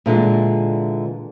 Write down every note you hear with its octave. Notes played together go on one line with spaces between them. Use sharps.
A#2 D3 E3 G#3